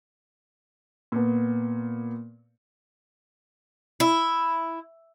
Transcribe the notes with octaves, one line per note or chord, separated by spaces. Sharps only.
A#2 B3
E4